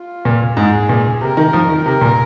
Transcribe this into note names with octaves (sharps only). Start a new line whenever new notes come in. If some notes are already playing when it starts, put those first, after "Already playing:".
Already playing: F4
A#2
G#2 G#4
A#2
C3 A#4
D#3
F3
D#3
C3 A#4
A#2